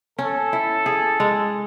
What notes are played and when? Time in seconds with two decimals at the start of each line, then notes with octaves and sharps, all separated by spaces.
0.19 C#4 A4
0.53 E4
0.86 G#4
1.20 G#3